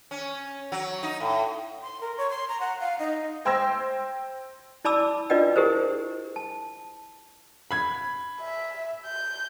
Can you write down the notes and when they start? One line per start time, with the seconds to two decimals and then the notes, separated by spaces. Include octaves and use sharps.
0.11 C#4
0.72 F#3
1.03 D#4
1.20 A2
1.82 C6
2.01 A#4
2.18 C#5
2.30 C6
2.48 A#5
2.60 F#5
2.80 F5
2.99 D#4
3.45 C5 G5 C6 E6 G#6 A#6
4.85 E4 D5 A5 B5 D6 E6
5.30 D4 F4 B4 D5 D#5 G5
5.56 E4 G4 G#4 A#4 C5
6.36 A5
7.71 B5 G#6
8.40 E5
9.06 G6